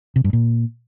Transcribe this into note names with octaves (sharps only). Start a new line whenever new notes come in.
C3
G2
A#2